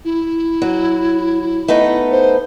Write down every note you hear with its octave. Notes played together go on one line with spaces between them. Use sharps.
E4
F#3
A3 B3 D#4
C5